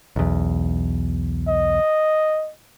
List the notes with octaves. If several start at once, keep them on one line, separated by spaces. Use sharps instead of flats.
B1 E2
D#5